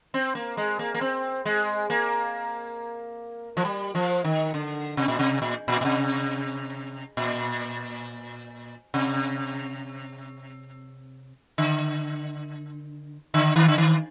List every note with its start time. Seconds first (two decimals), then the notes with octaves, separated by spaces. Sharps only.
0.14 C4
0.35 A#3
0.57 G#3
0.79 A#3
0.95 A#3
1.01 C4
1.45 G#3
1.90 A#3
3.57 F3
3.65 G3
3.95 F3
4.24 D#3
4.54 D3
4.97 C3
5.08 A#2
5.19 C3
5.42 A#2
5.68 A#2
5.81 A#2
5.85 C3
7.17 A#2
8.94 C3
11.58 D3
13.34 D3
13.56 D#3
13.68 D3
13.78 D#3